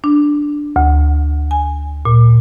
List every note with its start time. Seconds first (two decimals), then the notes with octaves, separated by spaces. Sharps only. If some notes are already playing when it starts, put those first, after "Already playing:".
0.04 D4
0.76 D2
1.51 G#5
2.05 A#2